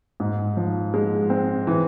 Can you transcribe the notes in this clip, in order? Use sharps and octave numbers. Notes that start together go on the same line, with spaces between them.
G#2
F3
G#3
C4
E3